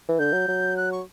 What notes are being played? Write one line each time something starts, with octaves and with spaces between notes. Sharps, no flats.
E3
D3 G6
F#3
F#3
F#6
C#6